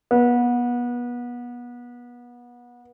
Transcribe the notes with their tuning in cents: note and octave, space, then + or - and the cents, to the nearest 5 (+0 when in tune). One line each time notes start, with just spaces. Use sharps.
B3 -30